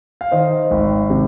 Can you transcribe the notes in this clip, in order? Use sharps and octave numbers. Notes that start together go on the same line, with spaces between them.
F5
D#3 C5 D#5
G#1
C3